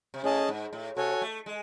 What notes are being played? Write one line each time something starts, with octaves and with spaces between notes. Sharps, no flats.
C3
A2 C#4 G#4 D#5 A5
G#2
A2
C3 F#4 A4 C#5 G#5
A3
G#3